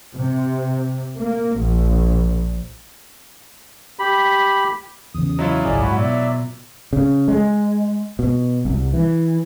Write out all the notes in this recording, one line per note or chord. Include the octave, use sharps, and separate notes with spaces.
C3
A#3
A#1
G4 B5
E2 C#3 D#6
F#3 E4 F4 D#5
G#1 C#2 G#4 D5 D#5
G#2 F#4 B5
B2 D5 E5
C#3
G#3
B2
C2
E3